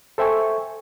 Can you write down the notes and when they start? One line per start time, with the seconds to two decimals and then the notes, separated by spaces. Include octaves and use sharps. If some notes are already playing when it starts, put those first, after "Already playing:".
0.18 A4 C5 E5 G5 G#5 C#6